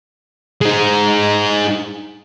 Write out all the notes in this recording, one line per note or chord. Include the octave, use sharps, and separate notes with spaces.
G#3 D#4